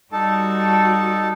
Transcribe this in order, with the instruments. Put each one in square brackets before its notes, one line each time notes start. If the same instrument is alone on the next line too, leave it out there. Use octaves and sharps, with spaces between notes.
[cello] G3 F#4 [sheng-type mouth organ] D#4 A4 A5